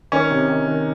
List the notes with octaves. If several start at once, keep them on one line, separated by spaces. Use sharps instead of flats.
D#3 C#4
C3
D#3
D#3